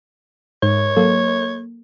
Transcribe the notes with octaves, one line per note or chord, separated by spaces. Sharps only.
G#2 C#5
F#3 A#3 A4